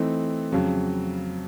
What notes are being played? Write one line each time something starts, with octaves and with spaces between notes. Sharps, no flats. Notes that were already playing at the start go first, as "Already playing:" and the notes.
Already playing: E3 A3 C4 D#4
F2 C#3 F#3